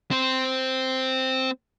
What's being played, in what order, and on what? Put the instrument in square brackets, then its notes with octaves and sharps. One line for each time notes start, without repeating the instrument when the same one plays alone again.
[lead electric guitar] C4 C5